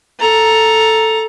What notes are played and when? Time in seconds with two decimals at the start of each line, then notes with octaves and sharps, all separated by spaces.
0.20 A4 A#5